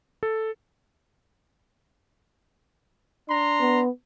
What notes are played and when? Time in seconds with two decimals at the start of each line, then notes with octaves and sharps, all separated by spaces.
0.23 A4
3.29 D4 A#5 C6
3.60 B3